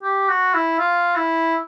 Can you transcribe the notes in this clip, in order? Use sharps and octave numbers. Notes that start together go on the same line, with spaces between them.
G4
F#4
E4
F4
E4